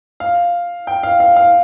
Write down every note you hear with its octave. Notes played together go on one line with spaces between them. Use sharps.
F5
G5
F5
F5
F5